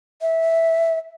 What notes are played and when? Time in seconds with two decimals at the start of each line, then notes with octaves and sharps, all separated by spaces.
0.22 E5